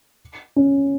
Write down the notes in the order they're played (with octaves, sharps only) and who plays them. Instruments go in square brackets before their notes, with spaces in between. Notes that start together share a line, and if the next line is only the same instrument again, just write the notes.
[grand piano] C#4